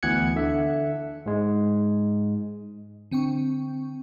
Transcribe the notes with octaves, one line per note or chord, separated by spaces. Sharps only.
D2 E3 B3 F#6 G#6 C#7
D3 E5
G#2 G#3
D3 C4 G5 C#6